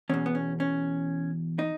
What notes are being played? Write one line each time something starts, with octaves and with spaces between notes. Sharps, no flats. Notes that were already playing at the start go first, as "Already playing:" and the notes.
E2 B2 C#4
B3
C#4
C#4
D#4